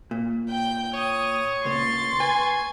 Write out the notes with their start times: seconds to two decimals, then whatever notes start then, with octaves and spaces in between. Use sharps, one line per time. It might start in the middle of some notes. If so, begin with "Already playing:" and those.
0.11 A#2
0.50 G5 G6
0.94 C#5 D#6
1.65 C#2 A#2 C6 C#6 A6
2.20 B4 G#5